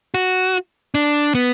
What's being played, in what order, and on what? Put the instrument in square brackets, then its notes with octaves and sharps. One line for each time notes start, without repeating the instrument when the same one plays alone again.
[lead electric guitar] F#4
D4
B3